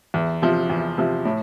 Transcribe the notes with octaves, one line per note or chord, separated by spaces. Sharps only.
E2
C3 F3
E2
C3 F3
A2